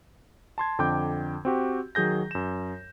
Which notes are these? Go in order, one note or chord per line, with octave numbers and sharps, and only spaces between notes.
A5 C6 G#6
F2 D3 G5 D6 G6
C4 F#4 G4
D#3 F#3 G#4 G6 A#6
F#2 E7